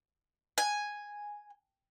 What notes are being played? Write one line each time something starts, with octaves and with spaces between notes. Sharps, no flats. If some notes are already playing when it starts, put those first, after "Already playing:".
G#5